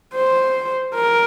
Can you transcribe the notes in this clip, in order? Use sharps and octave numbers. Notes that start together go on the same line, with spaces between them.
C5
A#4